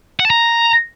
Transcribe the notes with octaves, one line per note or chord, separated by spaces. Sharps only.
F#5
A5
A#5